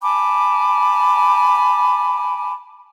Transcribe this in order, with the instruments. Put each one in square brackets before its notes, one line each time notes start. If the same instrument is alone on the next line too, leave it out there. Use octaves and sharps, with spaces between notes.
[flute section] G#5 A5 B5 D6